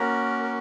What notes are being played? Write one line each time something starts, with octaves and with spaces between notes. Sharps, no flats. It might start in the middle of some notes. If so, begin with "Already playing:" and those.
Already playing: A#3 C#4 F#4 A#4
A#4